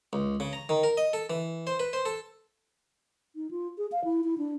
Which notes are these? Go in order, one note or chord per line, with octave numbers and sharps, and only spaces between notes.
C#2
C#3
A#5
D#3
A#4
D#5
A4
E3
C5
B4
C5
A4
D#4
F4
G#4
F5
E4
E4
D4